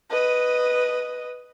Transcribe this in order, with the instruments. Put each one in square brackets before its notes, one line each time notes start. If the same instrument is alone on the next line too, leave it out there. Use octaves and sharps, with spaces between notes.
[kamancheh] B4 D#5